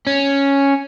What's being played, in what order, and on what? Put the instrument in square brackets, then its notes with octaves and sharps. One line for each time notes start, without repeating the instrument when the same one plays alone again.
[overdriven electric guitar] C#4